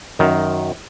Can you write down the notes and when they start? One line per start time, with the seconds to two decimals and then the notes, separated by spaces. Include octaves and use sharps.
0.19 F#2 D#3